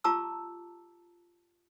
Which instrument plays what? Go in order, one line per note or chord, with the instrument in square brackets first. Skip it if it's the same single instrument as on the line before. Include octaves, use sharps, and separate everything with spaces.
[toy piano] F4 G4 A5 A#5 D6 E6